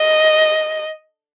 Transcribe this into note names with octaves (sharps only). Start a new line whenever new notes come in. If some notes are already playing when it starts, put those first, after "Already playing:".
Already playing: D#5